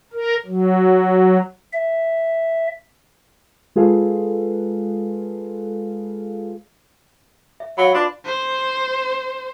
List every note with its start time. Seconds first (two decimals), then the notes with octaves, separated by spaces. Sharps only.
0.13 A#4
0.46 F#3
1.73 E5
3.76 G#3 F4 G#4 A4 B4 F5
7.60 E5
7.78 F#3 E5 F5 B5
7.94 D4 F4 B4 C6
8.26 C5